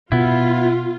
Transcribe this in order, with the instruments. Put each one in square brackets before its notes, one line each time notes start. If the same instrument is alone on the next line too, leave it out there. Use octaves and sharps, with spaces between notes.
[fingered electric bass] B2 [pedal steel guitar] B3 E4 [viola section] F4